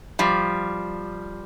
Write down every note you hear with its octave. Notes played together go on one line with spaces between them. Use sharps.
F3 G3